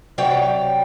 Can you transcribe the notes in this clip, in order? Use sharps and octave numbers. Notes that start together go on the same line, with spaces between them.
C3 F#3 C#5 D5 G5